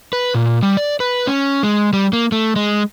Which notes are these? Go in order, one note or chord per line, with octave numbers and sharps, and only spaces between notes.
B4
A#2
G3
D5
B4
C#4
G#3
G3
A#3
A3
G#3